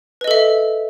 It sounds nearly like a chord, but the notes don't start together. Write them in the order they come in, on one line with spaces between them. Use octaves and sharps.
B4 D#5 A4 E5